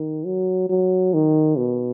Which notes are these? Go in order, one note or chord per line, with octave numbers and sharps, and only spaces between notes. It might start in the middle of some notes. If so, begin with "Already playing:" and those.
Already playing: D#3
F#3
F#3
D#3
B2